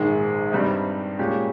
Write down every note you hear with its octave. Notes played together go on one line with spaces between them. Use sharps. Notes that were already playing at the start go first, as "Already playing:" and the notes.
Already playing: A#1 G#2 D#3 G#3
G2 G3 C4 D#4
A#2 G#3 C#4 G4